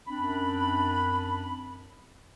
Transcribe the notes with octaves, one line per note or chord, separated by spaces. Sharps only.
F#2 C4 D4 B5